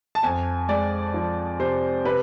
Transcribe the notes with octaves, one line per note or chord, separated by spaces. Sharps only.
A5
F2 G#5
G#3 D5
F3
C3 C5
C3 B4